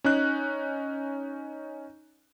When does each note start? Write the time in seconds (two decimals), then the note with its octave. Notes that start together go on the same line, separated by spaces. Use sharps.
0.04 C#4 D#4 F#6